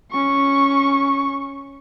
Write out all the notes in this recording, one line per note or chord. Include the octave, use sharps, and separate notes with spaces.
C#4 C#6